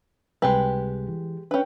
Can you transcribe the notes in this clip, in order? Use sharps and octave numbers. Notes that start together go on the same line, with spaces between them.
C#2 C3 G3 G#3 G4 B4
E3
C#4 D4 B4 G5